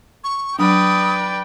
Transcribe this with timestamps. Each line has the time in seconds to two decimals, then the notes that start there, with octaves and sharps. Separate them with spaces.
0.24 C#6
0.59 F#3 D4 B4 D5 G5 D#6